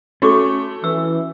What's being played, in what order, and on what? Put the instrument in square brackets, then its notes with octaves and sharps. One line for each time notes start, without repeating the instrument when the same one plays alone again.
[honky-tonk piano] A3 [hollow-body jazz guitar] C#4 [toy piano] F#4 C#6 D6
[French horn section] E3 [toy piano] E6